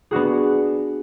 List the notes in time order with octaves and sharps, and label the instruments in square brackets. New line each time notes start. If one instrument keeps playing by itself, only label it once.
[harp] B3 D4 F#4 G#4